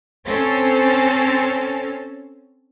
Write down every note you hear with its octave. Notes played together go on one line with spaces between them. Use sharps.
C4 C#4 A4